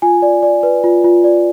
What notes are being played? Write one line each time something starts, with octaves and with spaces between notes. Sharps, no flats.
F4 G#5
D5
D5
B4
F4
F4
D5